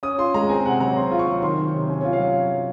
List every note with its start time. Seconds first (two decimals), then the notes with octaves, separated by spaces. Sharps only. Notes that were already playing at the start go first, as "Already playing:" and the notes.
0.03 C#4 D#6
0.18 F4 C6
0.34 G#3 A#5
0.49 C4 G#5
0.65 C3 F#5
0.80 F#3 A#5
0.96 C4 C6
1.11 F4
1.19 C#6
1.28 F#3
1.42 D#3 C6
1.58 F#3
1.74 C3
1.89 C#4 G#5
2.01 F4 C#5
2.13 F5
2.20 F#3